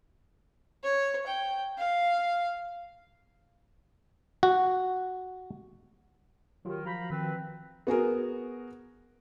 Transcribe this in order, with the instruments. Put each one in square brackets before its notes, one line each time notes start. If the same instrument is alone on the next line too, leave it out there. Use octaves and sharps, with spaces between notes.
[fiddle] C#5
G5
F5
[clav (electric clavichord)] F#4
[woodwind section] D#3 [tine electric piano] F#3 F4 G4
[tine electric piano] F3 F#4 G6 [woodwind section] F5 A#5 B5
[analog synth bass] D#3 [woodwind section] C4 B4
[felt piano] B3 F#4 G#4 A#4